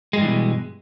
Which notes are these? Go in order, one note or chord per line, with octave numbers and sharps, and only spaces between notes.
G2 B2 E3 G#3